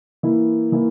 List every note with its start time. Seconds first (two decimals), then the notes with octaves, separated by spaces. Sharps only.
0.23 E3 A#3 E4
0.72 E3 A#3 E4